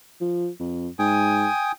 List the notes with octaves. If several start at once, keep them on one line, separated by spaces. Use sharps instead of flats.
F3
F2
G#2 G5 G#5 D#6